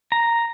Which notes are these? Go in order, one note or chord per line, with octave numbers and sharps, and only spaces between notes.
A#5